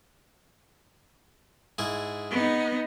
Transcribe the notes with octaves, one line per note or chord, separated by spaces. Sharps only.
G#2 E4 G#4
B3 D#4